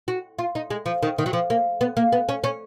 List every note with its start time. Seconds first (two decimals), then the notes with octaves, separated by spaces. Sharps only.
0.08 F#4
0.39 F4
0.55 D#4
0.70 G#3
0.86 F3
1.03 D#3
1.18 D#3
1.26 F#3
1.33 F3
1.50 A#3
1.81 B3
1.97 A#3
2.12 B3
2.29 C#4
2.44 C#4